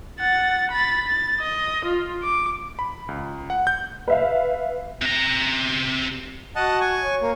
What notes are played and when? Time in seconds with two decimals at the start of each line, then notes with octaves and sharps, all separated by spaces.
0.19 F#5 A6
0.71 B5 A6
1.07 A6
1.40 D#5
1.85 F4
2.23 D6
2.79 B5
3.08 C#2
3.50 F#5
3.67 G6
4.08 B4 E5 F5
5.02 C3 A#5
6.56 F#4 D#5 F#5 A5
6.80 G#5 C#6
7.01 C#5
7.21 A#3